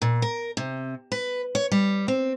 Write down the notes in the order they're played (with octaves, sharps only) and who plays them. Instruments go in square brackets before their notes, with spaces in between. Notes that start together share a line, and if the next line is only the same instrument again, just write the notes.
[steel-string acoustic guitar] A#2
A#4
C3
B4
C#5
G3
C4